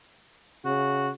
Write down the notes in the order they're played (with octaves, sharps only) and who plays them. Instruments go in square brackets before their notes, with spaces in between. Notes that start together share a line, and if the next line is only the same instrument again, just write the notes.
[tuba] C#3 [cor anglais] F#4